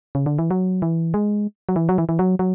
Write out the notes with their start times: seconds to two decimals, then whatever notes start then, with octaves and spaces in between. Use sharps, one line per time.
0.15 C#3
0.26 D3
0.39 E3
0.51 F#3
0.82 E3
1.14 G#3
1.69 F#3
1.76 E3
1.89 F#3
1.98 E3
2.09 E3
2.19 F#3
2.39 F#3